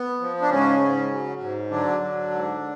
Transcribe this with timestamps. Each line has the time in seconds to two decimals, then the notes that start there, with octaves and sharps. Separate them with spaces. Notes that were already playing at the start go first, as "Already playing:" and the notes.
Already playing: B3
0.20 F3
0.41 D4
0.50 G#2 C#3 C#4
0.81 G#2
1.11 F#3
1.41 G#2
1.71 D3 F#3 D4
2.01 F#3
2.31 G#2